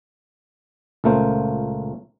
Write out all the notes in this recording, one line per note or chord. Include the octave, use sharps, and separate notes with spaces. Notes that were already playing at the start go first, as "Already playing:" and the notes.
C#2 A#2 A3 A#3 C5